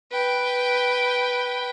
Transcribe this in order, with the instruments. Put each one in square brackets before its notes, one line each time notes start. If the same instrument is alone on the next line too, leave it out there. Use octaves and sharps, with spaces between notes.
[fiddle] B4 G5